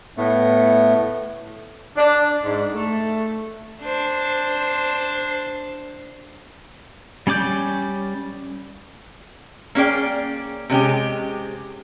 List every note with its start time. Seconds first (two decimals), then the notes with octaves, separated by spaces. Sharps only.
0.17 A2 A3 B3
1.97 D4
2.44 G#2
2.74 A3
3.82 D4 C5
7.27 G3 C#4 D5 D6 G6
9.75 A#3 C#4 G#4 D5 G5
10.70 C3 G#3 C#4 G4